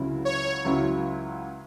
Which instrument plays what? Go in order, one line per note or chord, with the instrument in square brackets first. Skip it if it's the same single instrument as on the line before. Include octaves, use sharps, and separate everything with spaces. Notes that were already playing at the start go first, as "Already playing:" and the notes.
Already playing: [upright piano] C#2 C#3 F#3 C#4 E4
[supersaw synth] C#5
[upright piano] C#2 C#3 F#3 C#4 E4